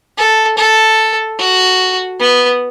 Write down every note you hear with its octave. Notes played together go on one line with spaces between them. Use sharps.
A4
A4
F#4
B3